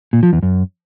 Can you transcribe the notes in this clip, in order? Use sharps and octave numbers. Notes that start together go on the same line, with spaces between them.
A#2
F3
E2
F#2